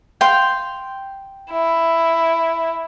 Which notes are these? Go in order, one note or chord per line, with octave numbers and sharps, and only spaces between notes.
F5 G5 C6
E4